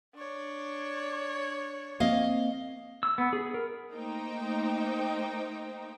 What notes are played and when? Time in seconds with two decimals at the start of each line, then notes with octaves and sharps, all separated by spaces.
0.15 D4 C#5
2.00 A#3 C4 D#5 F5
3.03 E6
3.18 B3
3.33 G#4
3.54 A#4
3.92 A3 A#3 D#4 C5 G5